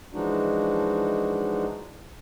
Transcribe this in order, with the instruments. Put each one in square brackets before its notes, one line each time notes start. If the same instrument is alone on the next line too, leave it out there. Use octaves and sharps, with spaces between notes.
[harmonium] E3 F3 G#3 D4 D#4 F#4